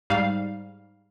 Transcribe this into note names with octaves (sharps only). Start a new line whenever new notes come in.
G#2 G3 F5